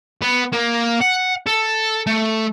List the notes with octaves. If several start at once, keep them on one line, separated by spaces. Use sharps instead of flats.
B3
A#3
F#5
A4
A3